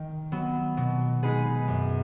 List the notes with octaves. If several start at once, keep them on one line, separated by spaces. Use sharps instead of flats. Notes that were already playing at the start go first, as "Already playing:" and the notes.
Already playing: D#3
F#3 B3
B2
G#3 D#4 G#4 B4
F#2